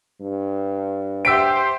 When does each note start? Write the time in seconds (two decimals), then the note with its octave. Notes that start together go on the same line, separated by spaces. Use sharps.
0.21 G2
1.25 G4 C5 E5 F#5 G5 E6 B6 D7